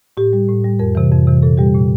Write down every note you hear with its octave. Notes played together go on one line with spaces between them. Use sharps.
A2 G4
G3
A2
G3
F2 A#4
C3 E3
F2
C3 E3
A#2 A4
G3 G4
A#2